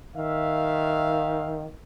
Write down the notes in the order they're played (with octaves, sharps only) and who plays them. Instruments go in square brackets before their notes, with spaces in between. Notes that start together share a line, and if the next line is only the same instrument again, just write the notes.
[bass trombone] D#3 [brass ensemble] E5 F5